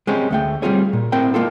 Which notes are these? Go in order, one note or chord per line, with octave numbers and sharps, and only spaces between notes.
G#3 C4 C#4 G4
D2 A3 G5
G3 B3 C4 F4 G#4 C#5
A#2
A2 C4 A#4 G5
G#3 A#3 F4 A4